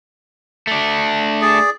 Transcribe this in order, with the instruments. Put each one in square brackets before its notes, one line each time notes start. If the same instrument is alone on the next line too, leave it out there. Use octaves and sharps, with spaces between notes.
[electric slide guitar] A3 D4
[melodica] G#4 D5